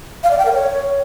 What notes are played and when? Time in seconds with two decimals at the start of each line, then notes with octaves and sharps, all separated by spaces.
0.23 F5
0.31 D5
0.38 G5
0.45 A#4
0.53 C#5